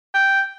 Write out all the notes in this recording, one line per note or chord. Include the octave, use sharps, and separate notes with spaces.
G5